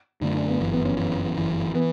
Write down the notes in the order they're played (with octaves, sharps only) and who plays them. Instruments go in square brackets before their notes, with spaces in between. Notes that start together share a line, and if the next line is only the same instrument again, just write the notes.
[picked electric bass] F#2 D3 A3 [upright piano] D4
[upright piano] D4
B3
[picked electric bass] G1 F#2 E3
[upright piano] B3
C#4
[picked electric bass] G1 F#2 E3
G1 F#2 E3
[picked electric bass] E3 [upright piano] B3